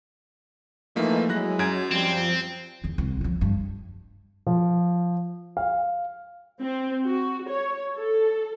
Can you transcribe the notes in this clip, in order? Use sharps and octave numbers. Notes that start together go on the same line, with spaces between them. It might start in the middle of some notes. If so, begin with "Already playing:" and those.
E3 F3 A3 A#3 D#4
F#3 G#3 E4 F#6 A#6
F#2 G#6 D7
F3 G3 C4
E2 C#3
C2
C#2 F3
G2
F3
F5
C4
F#4
C#5
A4